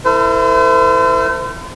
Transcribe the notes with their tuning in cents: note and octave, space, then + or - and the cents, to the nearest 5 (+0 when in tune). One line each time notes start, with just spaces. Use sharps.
E4 +0 A4 +45 C5 -40